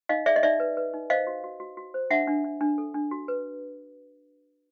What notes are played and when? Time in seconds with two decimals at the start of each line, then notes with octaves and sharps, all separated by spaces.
0.09 D#4 D#5 F5
0.26 G#4 D5 E5
0.36 D#5
0.43 D#4 D5 E5
0.60 B4
0.77 B4
0.94 D#4
1.10 C5 D#5 F5
1.27 F#4
1.44 F#4
1.60 F#4
1.77 F#4
1.94 C5
2.10 D4 E5 F#5
2.27 D4
2.44 D4
2.61 D4
2.78 A4
2.94 D4
3.11 F#4
3.28 B4